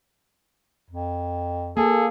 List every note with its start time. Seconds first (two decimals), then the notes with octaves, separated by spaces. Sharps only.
0.91 F2
1.77 A#3 G#4 A4